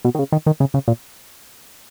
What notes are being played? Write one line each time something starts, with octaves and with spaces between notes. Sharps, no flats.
B2
D#3
C#3
D#3
D#3
C#3
C#3
A#2